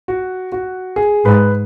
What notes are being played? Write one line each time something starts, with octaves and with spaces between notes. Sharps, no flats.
F#4
F#4
G#4
G#2 B4